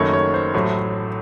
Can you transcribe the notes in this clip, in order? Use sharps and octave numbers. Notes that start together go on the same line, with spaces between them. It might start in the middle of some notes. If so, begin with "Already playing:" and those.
Already playing: F#1 F#2 D#3 A3 C#5
C#5
C5
A1 A2 F#3 A3